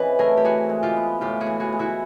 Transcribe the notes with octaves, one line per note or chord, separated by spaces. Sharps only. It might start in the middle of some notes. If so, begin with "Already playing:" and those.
Already playing: C#3 E3 C4 B4 D#5
A3 G#4 A#4
G4
E3 F#4 G#4
G#3
F4 G4
B3
A2 F4 G4
F#4 G#4
E3
F#4 G#4
G#3
E4 F#4